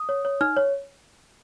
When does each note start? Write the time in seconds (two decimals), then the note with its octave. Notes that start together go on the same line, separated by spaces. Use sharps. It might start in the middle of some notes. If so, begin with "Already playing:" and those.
Already playing: D#6
0.09 C#5
0.25 C#5
0.41 D#4 F6
0.57 C#5